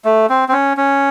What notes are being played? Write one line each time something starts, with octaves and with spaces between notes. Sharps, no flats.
A3
C4
C4
C#4
C#4